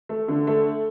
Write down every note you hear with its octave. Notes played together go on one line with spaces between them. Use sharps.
A3
D3
A3